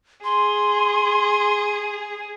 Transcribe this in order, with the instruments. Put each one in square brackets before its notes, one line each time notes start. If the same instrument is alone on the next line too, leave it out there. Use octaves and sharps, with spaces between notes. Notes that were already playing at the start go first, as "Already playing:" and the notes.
[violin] G#4 [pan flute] C6